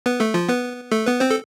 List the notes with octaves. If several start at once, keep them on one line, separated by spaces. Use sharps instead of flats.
B3 B4
A3 A4
F3 F4
B3 B4
A3 A4
B3 B4
C4 C5
A4